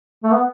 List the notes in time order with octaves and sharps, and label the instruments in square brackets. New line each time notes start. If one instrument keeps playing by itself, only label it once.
[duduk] A3
B3